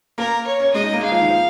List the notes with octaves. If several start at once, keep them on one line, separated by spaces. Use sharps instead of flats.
A#3 A#4
C#5
C#4
G#3 D#5
D#4
A#3
G#3 F5
F3
D#3
F3